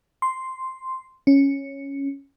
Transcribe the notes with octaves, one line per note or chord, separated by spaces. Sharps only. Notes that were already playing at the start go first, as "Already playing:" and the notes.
C6
C#4